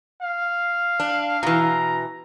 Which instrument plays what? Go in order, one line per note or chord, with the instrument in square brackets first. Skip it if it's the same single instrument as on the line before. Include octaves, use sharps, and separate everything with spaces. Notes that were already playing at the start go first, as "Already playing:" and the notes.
[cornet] F5
[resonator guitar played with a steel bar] D4
[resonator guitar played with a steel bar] B2 E3 [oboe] A#5